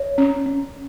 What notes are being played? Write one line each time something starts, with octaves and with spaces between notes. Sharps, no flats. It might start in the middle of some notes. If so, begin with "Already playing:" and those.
Already playing: C#5
C#4
C#4